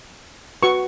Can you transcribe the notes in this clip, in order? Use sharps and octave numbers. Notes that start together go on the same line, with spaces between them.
F#4 B4 C#6